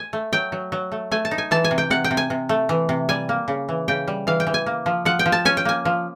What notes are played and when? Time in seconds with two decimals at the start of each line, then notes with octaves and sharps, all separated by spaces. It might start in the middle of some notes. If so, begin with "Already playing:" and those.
Already playing: G#5
0.13 A3
0.33 F#3 G5
0.52 F#3
0.72 F#3
0.92 A3
1.11 A3 G#5
1.25 A5
1.31 D#4
1.38 G#5
1.51 E3 A5
1.64 G#5
1.71 C3
1.78 G5
1.90 C3 F#5
2.04 G5
2.11 C3
2.17 G#5
2.30 C3
2.49 A3
2.69 E3
2.89 C3
3.09 G3 G#5
3.29 A#3
3.48 C#3
3.69 E3
3.88 C#3 G5
4.08 G3
4.27 E3 F5
4.40 G5
4.47 E3
4.54 G#5
4.66 A#3
4.86 F3
5.05 F3 F#5
5.19 G5
5.26 F3
5.32 A5
5.45 C#4 G#5
5.57 G5
5.65 A#3 G#5
5.85 F3